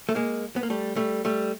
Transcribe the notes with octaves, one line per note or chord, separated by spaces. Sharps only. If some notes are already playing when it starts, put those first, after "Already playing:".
A3
G#3 A#3
B3
A#3
G3 A3
G3 A3
G3 A3